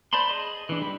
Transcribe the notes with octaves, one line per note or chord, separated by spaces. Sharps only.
C5 D5 A5 B5 C6
G#4 D#5
E3 D4
G3 B5